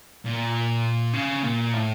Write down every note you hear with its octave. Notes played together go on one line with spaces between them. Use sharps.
A#2
C#3
A#2
A2